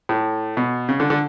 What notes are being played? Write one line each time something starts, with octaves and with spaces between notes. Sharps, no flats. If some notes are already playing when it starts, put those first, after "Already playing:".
A2
B2
C#3
D3
D3